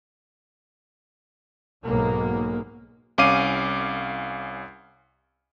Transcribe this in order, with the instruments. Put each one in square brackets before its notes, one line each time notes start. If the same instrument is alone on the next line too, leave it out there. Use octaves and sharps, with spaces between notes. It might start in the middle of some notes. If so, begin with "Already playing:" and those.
[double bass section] B1 G#2 B2 F#3 G#3 A#3
[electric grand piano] C2 C#4 F5 D6 C7 D#7